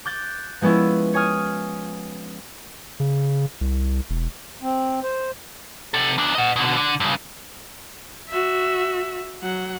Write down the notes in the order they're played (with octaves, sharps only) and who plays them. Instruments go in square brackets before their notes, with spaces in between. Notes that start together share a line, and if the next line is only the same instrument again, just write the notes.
[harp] D6 F#6 G6 A6
F3 G#3 B3 C#4 E4
C#5 G#5 D#6 F6
[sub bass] C#3
C2
E1
[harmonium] C4
C5
[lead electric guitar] C3 A4
E2 D4
D#5 F#5
B2 D3
D3
G2 C#3
[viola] F#4 E5
F#3 F#5